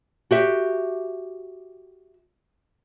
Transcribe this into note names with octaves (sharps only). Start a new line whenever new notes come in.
F#4 G4 E5